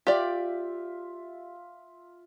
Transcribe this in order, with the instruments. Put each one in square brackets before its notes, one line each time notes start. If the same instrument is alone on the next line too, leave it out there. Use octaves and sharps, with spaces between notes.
[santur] F4 E5 [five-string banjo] G4 D5